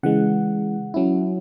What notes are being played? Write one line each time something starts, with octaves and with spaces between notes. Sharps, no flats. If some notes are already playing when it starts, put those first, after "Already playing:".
C#3 E3 G#3 F#5
F#3 C#4 E4